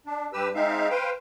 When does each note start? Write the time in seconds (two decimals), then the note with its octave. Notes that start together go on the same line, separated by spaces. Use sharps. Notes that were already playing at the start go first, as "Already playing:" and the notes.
0.06 D4
0.33 G2 G4 B4 E6
0.55 G#3 C4 D#4 E5 F5
0.90 B4 C5 F5 G5